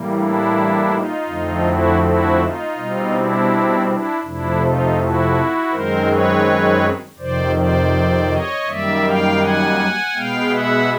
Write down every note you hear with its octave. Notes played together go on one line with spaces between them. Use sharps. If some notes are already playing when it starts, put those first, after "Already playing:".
Already playing: A2 E3 G3 A#3
D4 E4
D#4 F4
F2 D3 F3 A3 C4
E4 F#4
E4 F#4
D#4 F4
B2 G3 C4
D4 E4
D4 E4
F2 C3 F3 A3 D4 E4
D#4 F4
E4 F#4
F#2 D#3 G#3 C4 A#4 C5
B4 C#5
F2 C3 D#3 C5 D5
C5 D5
C#5 D#5
F#2 D#3 G3 A#3 D5 E5
F5 G5
F#5 G#5
B2 G#3 B3 F5 G5
E5 F#5